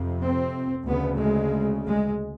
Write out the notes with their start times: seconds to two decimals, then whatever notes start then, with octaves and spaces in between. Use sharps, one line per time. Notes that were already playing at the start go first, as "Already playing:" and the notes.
Already playing: F2 C3
0.22 C4
0.87 D2 C#3 B3
1.20 G#3
1.86 G#3